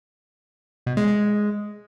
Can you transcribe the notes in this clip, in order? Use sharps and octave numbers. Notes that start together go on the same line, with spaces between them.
B2
G#3
G#3